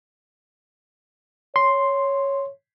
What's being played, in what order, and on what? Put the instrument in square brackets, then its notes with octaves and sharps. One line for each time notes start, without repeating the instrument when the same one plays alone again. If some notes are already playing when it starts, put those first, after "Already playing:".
[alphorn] C#5 [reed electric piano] C6